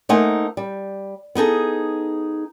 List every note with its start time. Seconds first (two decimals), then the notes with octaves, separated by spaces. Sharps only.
0.09 A3 A#3 D#4 C5 F#5 G#5
0.57 G3
1.35 B3 D#4 G#4 A4